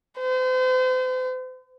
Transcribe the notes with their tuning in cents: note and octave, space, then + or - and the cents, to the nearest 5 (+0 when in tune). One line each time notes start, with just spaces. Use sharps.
C5 -40